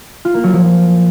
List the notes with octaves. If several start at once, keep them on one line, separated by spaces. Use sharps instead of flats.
F4
A#3
F#3
F3